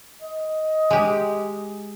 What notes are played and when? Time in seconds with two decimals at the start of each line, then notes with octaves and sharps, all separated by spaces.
0.22 D#5
0.91 G#3 G4